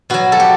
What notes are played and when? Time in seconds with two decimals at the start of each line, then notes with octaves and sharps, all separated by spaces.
0.10 B2 F#3 F#4
0.32 A4
0.40 G4